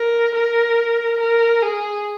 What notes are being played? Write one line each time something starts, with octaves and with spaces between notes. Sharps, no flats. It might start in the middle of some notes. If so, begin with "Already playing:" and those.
Already playing: A#4
A#4
A#4
G#4